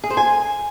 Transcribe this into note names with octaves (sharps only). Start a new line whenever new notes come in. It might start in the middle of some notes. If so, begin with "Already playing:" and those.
G#4
C5
G#5